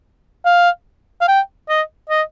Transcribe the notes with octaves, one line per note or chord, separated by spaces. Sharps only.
F5
F5
G5
D#5
D#5